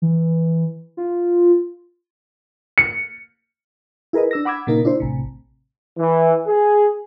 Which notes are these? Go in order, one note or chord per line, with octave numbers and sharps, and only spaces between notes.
E3
F4
C#7
E4 G#4 A#4 B4 D#5
D4 E6 A#6
F#5 B5 D6 E6 G#6
A#2 C#3 A#3 D#4 A#4
D4 E4 C5
A1 C3
E3
G#4